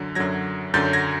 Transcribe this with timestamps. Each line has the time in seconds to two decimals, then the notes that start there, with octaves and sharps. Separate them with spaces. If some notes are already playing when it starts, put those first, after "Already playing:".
Already playing: F#2 D3 F#3
0.15 F#2 D3 F#3 G#6 A#6
0.74 F#2 D3 F#3 G6 A6
0.93 G#6 A#6